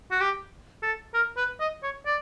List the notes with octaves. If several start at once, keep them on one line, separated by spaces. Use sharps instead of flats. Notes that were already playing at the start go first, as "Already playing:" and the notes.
F#4
G4
A4
A#4
B4
D#5
C#5
D5